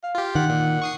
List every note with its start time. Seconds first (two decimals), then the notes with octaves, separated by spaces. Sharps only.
0.04 F5
0.15 F4 G4
0.35 D#3 F#5
0.49 A#2
0.82 C#6 D#6 C7